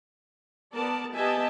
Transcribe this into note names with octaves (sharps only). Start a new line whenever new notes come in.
B3 A#4 D5 A5
B3 G4 D#5 E5 G#5 A5